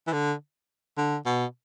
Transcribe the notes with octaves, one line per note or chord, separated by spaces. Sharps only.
E3
D3
D3
B2